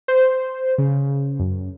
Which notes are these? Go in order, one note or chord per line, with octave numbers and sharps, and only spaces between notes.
C5
C#3
F#2